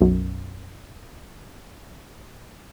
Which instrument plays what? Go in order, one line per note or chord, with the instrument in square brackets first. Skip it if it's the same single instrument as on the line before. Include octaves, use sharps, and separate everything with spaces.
[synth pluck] B1 F#2